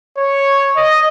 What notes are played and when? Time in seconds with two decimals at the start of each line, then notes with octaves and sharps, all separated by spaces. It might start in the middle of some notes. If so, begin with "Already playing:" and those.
0.18 C#5
0.77 D#5